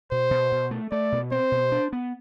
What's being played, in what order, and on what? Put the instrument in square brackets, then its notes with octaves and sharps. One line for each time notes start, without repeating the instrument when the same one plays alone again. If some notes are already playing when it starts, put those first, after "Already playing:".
[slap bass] B2 [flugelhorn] C5
[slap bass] B2
B2
A3
[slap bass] A3 [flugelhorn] D5
[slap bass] B2
[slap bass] C4 [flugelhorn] C5
[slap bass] B2
D4
B3